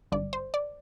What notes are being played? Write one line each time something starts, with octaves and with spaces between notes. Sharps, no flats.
G#1 G2 D3 D5
C5
D5